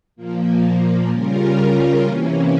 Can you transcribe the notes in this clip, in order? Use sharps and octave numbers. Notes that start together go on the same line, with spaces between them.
A#2 F3 A#3
C#3 G3 C#4 F4 A#4
C3 E3 A#3 C#4